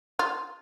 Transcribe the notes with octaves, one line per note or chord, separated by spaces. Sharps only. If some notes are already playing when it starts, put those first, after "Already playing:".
F4